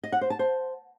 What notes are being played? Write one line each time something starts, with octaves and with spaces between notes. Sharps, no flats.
D#5
F#5
C5
A5
C5